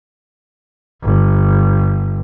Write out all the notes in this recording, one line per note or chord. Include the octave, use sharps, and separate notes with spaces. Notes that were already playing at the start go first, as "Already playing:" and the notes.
G1